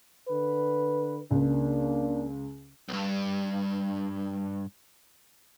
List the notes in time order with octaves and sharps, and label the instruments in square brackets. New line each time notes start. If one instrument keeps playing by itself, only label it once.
[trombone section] D3 B4
[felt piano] C#2 [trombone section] A#3 D4
[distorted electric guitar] B1 G2